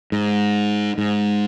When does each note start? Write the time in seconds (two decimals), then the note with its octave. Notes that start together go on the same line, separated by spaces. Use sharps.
0.12 G#2
0.98 G#2